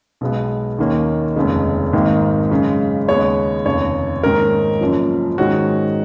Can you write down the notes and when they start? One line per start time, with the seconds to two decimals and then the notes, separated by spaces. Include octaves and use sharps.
0.21 B1 B2 G#3 B3
0.79 D#2 D#3 A#3 C#4
1.36 F1 D#2 C#3 G#3
1.93 G#1 G#2 D#3 A#3
2.51 F#2 C#3 G#3
3.08 D#2 C#3 G#3 B3 C#5
3.66 F1 D#2 C#3 C#5
4.23 G#2 D#3 A#3 C#4 A#4
4.81 F#1 F#2 F3
5.38 G#2 D#3 G#3 C#4 F#4